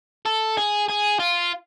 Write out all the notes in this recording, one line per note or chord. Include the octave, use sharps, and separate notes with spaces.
A4
G#4
G#4
F4